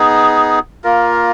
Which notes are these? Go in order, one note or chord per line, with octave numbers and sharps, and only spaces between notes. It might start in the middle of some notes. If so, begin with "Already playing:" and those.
Already playing: B3 D#4 G#4
A#3 F4 A#4